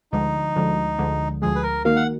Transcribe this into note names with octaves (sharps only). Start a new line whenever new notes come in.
D2 D3 F3 G#3 D#4
D2 D3 F3 G#3
D2 D3 F3 G#3
D2 D3 F3 G#3 G#4
B4
A#4
D#3 A#3 D#4 F#4 A#4 F5
F#5